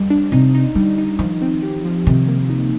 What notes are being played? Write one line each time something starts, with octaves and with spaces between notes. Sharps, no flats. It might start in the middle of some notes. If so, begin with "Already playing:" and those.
Already playing: F2 G3
D4
C3 D#4
D#4
D3 G3
D#4
D#3 F3
C4
G4
F3
C3 D#3
A#3
D#4